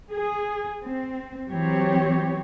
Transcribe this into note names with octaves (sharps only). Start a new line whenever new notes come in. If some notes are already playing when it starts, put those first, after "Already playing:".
G#4
C4
E3 F#3 C4 G4 C#5